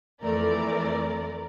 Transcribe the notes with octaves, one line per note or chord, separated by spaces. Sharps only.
F2 E3 A3 A#4 D5